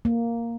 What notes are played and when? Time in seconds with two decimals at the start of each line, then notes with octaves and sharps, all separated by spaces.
0.05 A#3